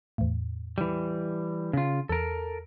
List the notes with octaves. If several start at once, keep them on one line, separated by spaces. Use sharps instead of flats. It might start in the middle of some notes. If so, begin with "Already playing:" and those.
E2 A2
E3 G3
C#3 F4
E2 A4 A#4